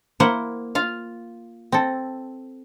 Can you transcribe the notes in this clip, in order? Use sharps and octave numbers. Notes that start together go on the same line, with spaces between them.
A#3 E4 C5 F#5
F4 F5
C4 A4